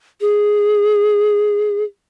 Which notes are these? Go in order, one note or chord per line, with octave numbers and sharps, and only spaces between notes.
G#4